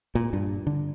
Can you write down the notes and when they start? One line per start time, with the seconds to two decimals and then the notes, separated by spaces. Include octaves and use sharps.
0.15 A#2
0.33 G2
0.67 D3